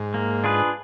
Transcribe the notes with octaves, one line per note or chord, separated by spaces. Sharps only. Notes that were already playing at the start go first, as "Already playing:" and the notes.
Already playing: G#2
A#3
D4 F4 G#4 B4